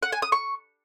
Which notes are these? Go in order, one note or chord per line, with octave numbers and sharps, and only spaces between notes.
F#5
G#5
D#6
C#6